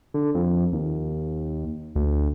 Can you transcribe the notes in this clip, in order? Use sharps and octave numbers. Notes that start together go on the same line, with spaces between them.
D3
F2
D#2
D2